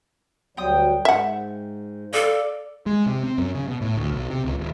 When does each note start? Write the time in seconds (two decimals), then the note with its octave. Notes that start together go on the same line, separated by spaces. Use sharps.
0.57 D2 F#3 G3 G5 D#6
1.05 G#2 E5 F#5
2.13 A4 D5 F5
2.86 G#3
3.06 C3
3.23 C4
3.38 F#2
3.55 C#3
3.68 B2
3.81 A2
3.96 D2
4.11 B1
4.30 C3
4.44 C#2
4.58 D#1